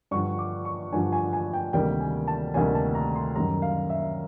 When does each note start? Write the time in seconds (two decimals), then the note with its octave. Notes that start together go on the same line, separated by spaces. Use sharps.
0.11 G2 D3 F3 C#6
0.38 D6
0.65 C#6
0.93 G2 D3 F3 G#5
1.12 G#5
1.33 G#5
1.53 G5
1.73 D2 C3 D#3 G3 A#3 G5
2.00 G#5
2.28 A5
2.54 D2 C3 D#3 G3 A#3 G#5
2.75 A5
2.95 A#5
3.15 C6
3.35 F#2 D#3 G3 A#5
3.62 F5
3.90 E5